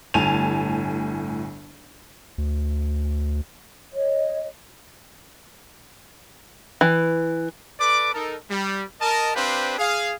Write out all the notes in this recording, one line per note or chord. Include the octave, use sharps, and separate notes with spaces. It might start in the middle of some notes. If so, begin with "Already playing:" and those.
G1 A2 G#5 A5 D#7 F7
D2
C#5 D#5
E3
A4 B4 D5 D6
D#4 A4 A#4
G3
A#4 D#5 A5
C4 D4 G4 B4 C5 F5
G#4 F5